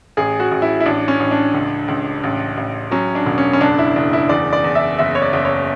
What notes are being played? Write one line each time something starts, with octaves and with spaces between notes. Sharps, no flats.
A1 G#4
F#4
A1
E4
E4
A1 D4
C#4
A1
D4
C#2
C#2
A1
A1
F#3 C#4
D4
E1
C#4
C#4
F#1 D4
E4
F#1 D4
E4
E2 D5
D5
E2
E5
F#1 E5
C#5
D5
F#1
C#5